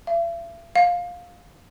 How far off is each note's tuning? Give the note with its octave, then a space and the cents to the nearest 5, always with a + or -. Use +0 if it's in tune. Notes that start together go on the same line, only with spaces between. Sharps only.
E5 +45
F5 +15